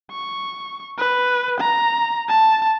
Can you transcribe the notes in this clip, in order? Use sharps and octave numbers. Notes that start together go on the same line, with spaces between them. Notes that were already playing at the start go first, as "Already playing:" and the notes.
C#6
B4
A#5
A5